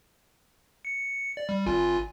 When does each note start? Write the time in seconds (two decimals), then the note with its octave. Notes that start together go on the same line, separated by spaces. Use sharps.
0.85 C#7
1.37 D5
1.49 G3
1.66 G#1 F4 G#5